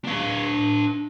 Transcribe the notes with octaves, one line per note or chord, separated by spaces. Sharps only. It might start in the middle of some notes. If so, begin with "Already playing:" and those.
D4 F5